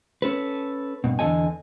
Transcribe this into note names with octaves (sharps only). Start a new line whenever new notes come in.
C#4 A4 B4
G2 B2
E2 D3 G#4 A4 D#5 G#5